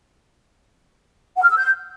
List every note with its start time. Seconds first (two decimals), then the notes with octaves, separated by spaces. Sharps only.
1.36 F#5
1.43 F6
1.50 E6
1.57 G6